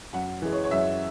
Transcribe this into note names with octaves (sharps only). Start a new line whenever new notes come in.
F#2 F#5
E3 G#3
C#5
C#5
F#2 E5